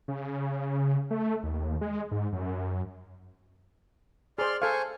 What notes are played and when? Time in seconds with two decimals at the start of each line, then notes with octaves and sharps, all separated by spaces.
0.08 C#3
1.11 A3
1.43 D#2
1.81 G#3
2.11 G#2
2.33 F#2
4.38 G#4 C5 D5 C6 F6
4.62 A4 C5 F5 G#5 C#6